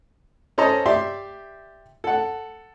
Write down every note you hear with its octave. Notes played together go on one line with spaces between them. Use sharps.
C#4 A4 C5 D#5 A#5
G4 D5 E5 C6
A4 F#5